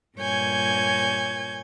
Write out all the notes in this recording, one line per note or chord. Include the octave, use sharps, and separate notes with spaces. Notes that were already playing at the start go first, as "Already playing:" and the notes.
G2 A#2 C#5 G#5 G6 G#6